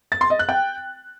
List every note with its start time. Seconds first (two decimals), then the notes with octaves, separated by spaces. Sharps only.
0.12 A6
0.21 C6
0.30 D#5
0.39 F#6
0.49 G5